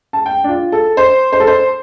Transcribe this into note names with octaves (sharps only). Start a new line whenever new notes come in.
A5
G5
D4
F4
A4
C5
C5
A4
C5